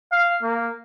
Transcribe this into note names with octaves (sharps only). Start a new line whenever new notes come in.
F5
A#3